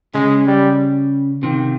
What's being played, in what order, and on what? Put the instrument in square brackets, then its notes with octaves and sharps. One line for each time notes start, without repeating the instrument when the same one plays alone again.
[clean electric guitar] C#3 [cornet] G#3
[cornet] G3
[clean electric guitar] C3 D#3